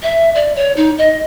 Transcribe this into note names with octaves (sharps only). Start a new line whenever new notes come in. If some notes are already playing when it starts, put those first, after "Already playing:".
E5
D5
C#5
D#4
D#5